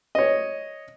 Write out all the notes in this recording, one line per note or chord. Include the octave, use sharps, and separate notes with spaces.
C#5 D#5